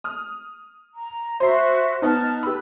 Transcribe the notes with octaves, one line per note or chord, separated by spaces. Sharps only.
D#6 F6
A#5
F#4 C5 E5 C7
B3 D#4 A5 F6
G4 B4 B5 E6